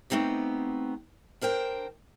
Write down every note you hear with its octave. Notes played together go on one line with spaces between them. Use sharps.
A3 B3 C4 D#4 G4
D4 A#4 C5 G5